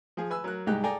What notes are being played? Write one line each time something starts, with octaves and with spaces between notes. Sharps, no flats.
F3 G#4
B4 G#5 E6
F#3 A#4 F#6
C2 G#2 G#3 G4 F#6
G#4 A4 D5 G5 G#5 A#5